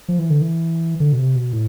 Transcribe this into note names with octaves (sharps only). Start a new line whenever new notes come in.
F3
E3
D3
E3
D3
B2
C3
B2
A2